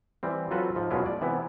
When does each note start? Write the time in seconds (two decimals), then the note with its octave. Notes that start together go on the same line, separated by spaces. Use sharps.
0.23 E3 G3 C4
0.51 F#3 C4 F4 F#4 A4 B4
0.75 G#2 F3
0.90 F#2 B2 G#3 C#4 E4 F4
1.06 D5
1.21 C3 E3 B3 E4